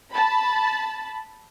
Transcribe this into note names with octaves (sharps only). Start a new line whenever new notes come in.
A5 B5